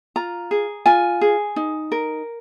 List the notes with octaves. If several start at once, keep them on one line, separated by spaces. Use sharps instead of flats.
F4 A#5
G#4
F4 G#5
G#4
D#4
A#4